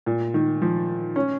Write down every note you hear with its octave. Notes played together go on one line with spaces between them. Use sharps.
A#2
D#3
F3
C#4